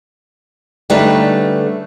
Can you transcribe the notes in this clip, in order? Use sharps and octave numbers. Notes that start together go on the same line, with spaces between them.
D3 G3 A3 C#4 D#4 B4